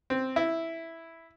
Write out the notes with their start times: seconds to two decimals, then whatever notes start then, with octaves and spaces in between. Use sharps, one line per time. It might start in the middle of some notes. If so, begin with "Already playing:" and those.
0.10 C4
0.36 E4